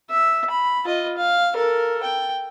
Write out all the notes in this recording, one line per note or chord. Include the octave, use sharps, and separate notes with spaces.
E5
B5
F4 D#5
F5
A4 A#4
G5